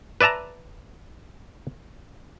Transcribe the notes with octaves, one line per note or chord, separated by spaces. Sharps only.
B4 D5 E5 A5 A#5